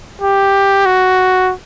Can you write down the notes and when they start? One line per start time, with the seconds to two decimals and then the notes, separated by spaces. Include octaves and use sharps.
0.21 G4
0.86 F#4